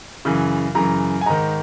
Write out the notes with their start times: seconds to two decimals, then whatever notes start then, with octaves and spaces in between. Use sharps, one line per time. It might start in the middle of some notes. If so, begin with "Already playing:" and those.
0.25 F#2 C#3 E3
0.75 F#2 C#3 E3 A#5
1.21 G#5
1.26 G#2 D#3 A#5